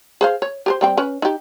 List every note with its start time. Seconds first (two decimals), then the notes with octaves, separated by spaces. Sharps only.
0.21 G#4 C5 F5
0.42 C#5
0.66 G4 A#4 C5
0.81 G3 C4 G5
0.97 C#4 B4
1.22 D#4 G4